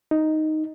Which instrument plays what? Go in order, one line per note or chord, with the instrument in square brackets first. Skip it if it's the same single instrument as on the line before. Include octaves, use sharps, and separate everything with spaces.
[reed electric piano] D#4